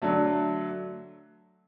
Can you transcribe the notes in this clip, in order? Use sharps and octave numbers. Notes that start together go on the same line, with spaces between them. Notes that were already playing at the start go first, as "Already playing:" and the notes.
D3 F#3 A3